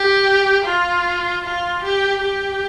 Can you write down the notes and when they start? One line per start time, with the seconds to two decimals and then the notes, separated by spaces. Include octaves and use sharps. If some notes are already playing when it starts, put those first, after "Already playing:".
Already playing: G4
0.65 F4
1.44 F4
1.83 G4
2.22 G4